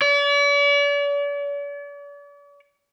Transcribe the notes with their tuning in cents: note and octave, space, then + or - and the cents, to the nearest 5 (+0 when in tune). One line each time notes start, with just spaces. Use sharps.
D5 -45